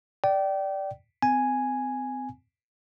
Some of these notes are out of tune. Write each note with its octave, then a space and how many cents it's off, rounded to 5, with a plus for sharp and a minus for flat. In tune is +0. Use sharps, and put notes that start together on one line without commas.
D5 +0 G5 -25
C4 -35 G#5 +0